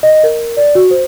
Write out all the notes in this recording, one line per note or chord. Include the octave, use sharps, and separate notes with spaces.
D#5
A#4
D5
F#4
C5